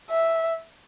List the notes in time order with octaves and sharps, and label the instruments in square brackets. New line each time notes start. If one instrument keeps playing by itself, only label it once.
[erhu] E5